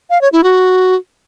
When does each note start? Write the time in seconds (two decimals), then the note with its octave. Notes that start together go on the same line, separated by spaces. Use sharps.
0.10 F5
0.21 C#5
0.33 E4
0.44 F#4